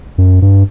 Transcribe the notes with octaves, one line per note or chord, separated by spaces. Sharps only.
F#2
G2